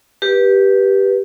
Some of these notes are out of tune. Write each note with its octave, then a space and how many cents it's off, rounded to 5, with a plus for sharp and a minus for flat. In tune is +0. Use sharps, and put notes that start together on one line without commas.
G4 +0 B4 -20